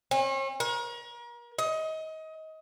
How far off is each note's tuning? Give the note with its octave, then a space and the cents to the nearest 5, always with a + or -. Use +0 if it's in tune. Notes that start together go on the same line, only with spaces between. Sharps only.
C#4 -45
A#4 +35
D#5 +25